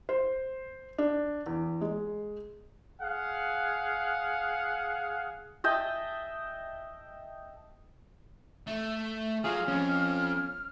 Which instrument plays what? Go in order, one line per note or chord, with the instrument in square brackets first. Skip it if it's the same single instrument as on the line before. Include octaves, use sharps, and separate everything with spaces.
[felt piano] C5
D4
E2
G#3
[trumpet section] G#4 F5 F#5
[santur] D#5 E5 G5 A5
[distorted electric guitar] A3
[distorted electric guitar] F#3 [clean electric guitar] F4 G#4 [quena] F6
[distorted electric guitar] F2 F3 [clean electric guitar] C#4